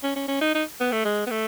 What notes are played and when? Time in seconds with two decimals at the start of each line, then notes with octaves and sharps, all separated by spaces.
0.03 C#4
0.16 C#4
0.28 C#4
0.41 D#4
0.55 D#4
0.80 B3
0.92 A3
1.05 G#3
1.26 B3
1.30 A3